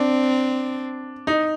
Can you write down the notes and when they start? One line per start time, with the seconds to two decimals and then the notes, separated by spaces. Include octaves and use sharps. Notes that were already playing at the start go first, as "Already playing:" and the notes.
Already playing: C4 D4
1.27 D#4